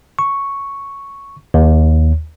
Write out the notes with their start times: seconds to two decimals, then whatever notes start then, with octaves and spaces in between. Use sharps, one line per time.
0.19 C#6
1.54 D#2